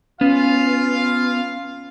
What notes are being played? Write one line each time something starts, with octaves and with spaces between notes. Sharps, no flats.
B3 C#4 F4 F5